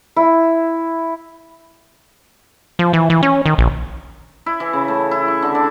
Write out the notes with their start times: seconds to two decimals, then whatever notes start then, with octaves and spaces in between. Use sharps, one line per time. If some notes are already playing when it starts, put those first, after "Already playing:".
0.16 E4
2.79 F3
2.93 E3
3.10 E3
3.23 C#4
3.46 D#3
3.58 A#1
4.46 E4
4.60 E3
4.73 C#3
4.88 A3
5.11 E4
5.28 C#6
5.42 D3
5.55 D4